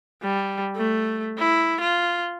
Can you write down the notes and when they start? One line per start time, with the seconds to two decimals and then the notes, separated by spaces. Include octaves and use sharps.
0.23 G3
0.76 A3
1.39 E4
1.81 F4